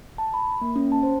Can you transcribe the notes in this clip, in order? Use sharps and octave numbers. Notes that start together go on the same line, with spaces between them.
A5
B5
A#3
C#4
A5
C5